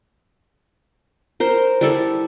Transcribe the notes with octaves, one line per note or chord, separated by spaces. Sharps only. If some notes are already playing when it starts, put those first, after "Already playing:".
A#4 C5
G3 E4 A4